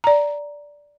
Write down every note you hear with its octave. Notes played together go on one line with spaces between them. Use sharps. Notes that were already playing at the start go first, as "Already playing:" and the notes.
D5 A#5